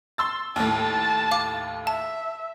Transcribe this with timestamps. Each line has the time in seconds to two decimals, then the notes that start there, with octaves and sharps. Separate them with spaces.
0.18 C6 E6 A6
0.56 D#2 A2 A5
1.31 F5 D6
1.87 E5 A5